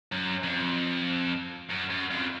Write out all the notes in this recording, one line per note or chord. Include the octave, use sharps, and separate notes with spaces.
F#2
F2
F#2
F#2
F2